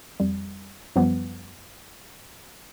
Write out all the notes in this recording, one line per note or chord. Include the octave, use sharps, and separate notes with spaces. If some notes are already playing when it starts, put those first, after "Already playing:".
F2 G3
F#2 F3 G3 B3